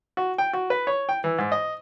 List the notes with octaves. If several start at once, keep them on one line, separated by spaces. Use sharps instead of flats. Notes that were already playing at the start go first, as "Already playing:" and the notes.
F#4
G5
F#4
B4
C#5
G5
E3
G#2
D#5